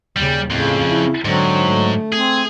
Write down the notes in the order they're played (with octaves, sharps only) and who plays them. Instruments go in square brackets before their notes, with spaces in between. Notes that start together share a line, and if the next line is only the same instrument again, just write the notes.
[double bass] D#2 C#3 [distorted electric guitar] G3
[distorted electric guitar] F2 [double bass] A2 [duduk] C#3
[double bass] E4
[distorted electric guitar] G#2 [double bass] D3 C4 [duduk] F#3
[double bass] A3
[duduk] C4 [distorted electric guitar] G#4